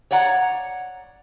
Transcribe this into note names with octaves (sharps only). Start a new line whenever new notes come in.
C#5 D5 F#5 A#5